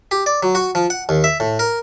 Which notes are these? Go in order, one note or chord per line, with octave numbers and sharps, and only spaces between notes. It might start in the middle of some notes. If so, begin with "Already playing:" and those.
G4
D5
F#3
F#4
F3
F#5
D#2
E5
A2
A#4